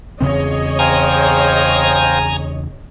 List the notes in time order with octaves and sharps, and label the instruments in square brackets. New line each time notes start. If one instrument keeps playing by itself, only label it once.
[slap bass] E2 C#3 C4 [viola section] G#4 C#5 D#5
[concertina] C5 F5 G5 [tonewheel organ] G#5 A#5